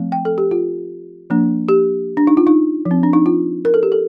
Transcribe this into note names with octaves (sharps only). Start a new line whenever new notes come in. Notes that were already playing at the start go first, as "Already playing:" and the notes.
Already playing: F3 A3 C4
G5
A4
G4
F4
F3 A#3 D4
G4
D4
D#4
F4
D#4
F3
C4
D4
D#4
F4
A#4
A4
G4
A4